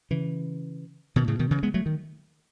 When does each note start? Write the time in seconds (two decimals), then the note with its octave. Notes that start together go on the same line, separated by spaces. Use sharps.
0.11 C#3 E3
1.16 B2 D#3
1.28 A2 C#3
1.39 B2 D#3
1.51 C#3 E3
1.63 G#3 B3
1.74 F#3 A3
1.86 D#3